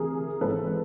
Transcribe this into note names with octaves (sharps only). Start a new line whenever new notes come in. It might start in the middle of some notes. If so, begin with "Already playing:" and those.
Already playing: D2 C3 E3 G#4 A#4
G#1 G#2 E3 A4 B4